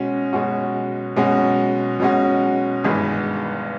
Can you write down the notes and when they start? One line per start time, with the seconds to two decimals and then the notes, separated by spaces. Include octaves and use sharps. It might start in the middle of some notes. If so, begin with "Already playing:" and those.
Already playing: B2 G#3 C#4 F#4
0.33 B2 G#3 C#4 F#4
1.16 B2 G#3 C#4 F#4
2.00 B2 G#3 C#4 F#4
2.84 G#1 G2 E3 G#3 B3